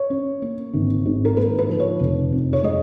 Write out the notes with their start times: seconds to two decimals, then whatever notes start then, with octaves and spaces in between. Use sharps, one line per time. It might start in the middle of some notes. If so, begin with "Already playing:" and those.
Already playing: C#5
0.10 C#4
0.42 A#3
0.74 G#1
1.05 G#2
1.25 A#4
1.36 A#3 B4
1.59 B4
1.69 F3
1.80 C#5
2.00 F1
2.32 F2
2.53 C#5
2.63 G#3 D#5